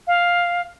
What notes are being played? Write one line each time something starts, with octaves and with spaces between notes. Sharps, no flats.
F5